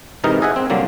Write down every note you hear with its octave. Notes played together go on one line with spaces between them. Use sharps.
G#2 C3 E3 D#4 A#4 D#5
G#4 D#5 E5 F#5 G#5
C4
C2 D3 F#3 A#3